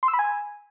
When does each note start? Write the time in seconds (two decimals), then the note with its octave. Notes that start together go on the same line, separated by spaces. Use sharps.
0.03 C6
0.08 E6
0.14 B5
0.19 G#5